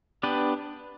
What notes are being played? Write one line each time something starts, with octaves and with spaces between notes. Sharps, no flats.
B3 D4 G4 B4